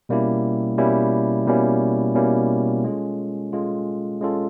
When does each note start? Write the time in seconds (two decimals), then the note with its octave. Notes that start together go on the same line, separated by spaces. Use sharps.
0.09 B2 G3 A#3 C#4 E4
0.78 B2 G3 A#3 C#4 E4
1.47 B2 G3 A#3 C#4 E4
2.15 B2 G3 A#3 C#4 E4
2.84 G#3 C#4 F4 A4
3.53 G#3 C#4 F4 A4
4.21 G#3 C#4 F4 A4